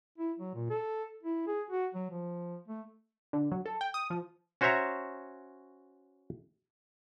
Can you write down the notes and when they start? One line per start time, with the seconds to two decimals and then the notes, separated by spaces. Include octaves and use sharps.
0.18 E4
0.39 F#3
0.54 A#2
0.70 A4
1.23 E4
1.47 G#4
1.70 F#4
1.94 F#3
2.11 F3
2.68 A3
3.33 D3
3.52 F#3
3.66 A4
3.81 G5
3.94 D#6
4.10 F3
4.61 C#4 F#4 C5 C#5 E5 A#5